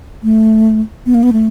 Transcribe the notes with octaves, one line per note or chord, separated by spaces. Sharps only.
A3
B3
A#3
B3
A3